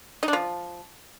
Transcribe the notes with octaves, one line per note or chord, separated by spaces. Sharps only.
D#4
D4
F3